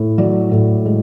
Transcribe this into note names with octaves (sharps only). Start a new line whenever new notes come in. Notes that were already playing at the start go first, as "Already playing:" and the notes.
Already playing: A2
F#3 D5
A2
G#3